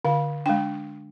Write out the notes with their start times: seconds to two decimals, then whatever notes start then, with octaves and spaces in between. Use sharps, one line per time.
0.05 D3 F5
0.46 G#3 D4 G5